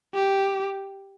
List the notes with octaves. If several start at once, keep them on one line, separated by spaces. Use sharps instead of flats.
G4